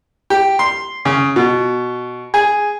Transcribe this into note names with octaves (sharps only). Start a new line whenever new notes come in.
G4
C6
C#3
B2
G#4